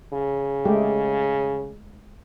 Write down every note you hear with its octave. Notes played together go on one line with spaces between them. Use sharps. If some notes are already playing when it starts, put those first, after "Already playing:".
C#3
G#3 A3 G4